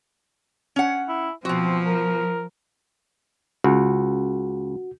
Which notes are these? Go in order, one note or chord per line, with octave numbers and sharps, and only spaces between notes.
C#4 F#5
E4
B2 F3 C4 F#4
A#4
C#2 F#4